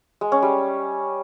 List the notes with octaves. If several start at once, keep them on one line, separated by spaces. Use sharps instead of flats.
G#3
C#4
G3